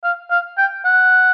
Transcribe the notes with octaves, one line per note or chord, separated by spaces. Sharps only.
F5
F5
G5
F#5